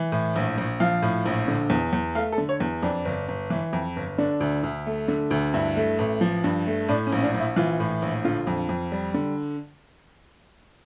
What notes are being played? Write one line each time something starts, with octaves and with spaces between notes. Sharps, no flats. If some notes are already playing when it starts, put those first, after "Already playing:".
Already playing: E3
A2
A#1
A#1
F3 F5
A2
A#1
D3
E2
E2
A3 F5
A4
D3
C#5
E2
F2 D4
G1
G1
E3
F2
G1
D3 D4
D2
D2
A3
D3
D2
G2 E4
A3
A1
F3
G2
A3
A2 D4
C#4
A#1
C#4
D4
A#1
E4
E3 F4
A2
A#1
D3 F4
F2
F2
G3
D3